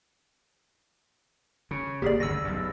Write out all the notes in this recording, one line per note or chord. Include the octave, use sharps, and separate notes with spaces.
C#3
G#1 A#3 G4 G#4 D5
G1 D2 C#3 E6 A#6
B1 F#2